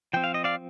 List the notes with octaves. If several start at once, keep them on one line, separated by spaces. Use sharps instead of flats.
F3 C4 G5
F5
D#5
D5 F5